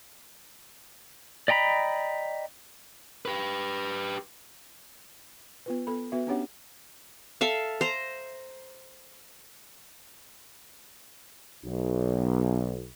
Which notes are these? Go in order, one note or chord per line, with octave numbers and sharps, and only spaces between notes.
D5 D#5 G5 A#5 B5
G4 B4
B3 F4 B4
B3 A4 B5
B3 F#4 B4 E5
B3 C#4 D4 G4 C#5 F#5
A4 E5 F5
C5 A#5
B1